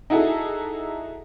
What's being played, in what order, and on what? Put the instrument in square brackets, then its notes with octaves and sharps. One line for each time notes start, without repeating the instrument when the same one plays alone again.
[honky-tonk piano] D#4 E4 F#4 G#4 A4